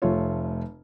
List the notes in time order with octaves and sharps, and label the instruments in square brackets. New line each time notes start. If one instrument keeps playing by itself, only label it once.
[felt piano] F1 A3 F4 C#5